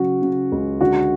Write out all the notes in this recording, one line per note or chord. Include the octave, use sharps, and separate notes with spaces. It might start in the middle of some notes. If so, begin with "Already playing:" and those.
Already playing: C#3 F#3 F#4
C#3
C#2
D3 F#4